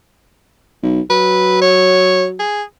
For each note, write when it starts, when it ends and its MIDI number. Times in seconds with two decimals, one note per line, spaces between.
0.83 1.00 35
1.10 2.41 54
1.10 1.61 71
1.62 2.25 73
2.39 2.63 68